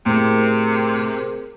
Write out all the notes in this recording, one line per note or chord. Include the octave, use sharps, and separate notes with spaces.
A2 C3 G#4 A#4 C5